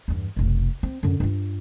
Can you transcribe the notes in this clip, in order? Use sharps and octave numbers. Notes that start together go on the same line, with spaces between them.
E2 G2
F1 B1
C4
F#2 D3
G2 F4